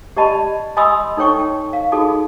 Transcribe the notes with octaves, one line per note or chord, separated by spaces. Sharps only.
G4 D5 D#5 A5 B5
D#5 G#5 B5 C6 D#6 E6
D#4 A4 C#5 G5 C#6
G5
F5
D#4 F4 F#4 G#4 A4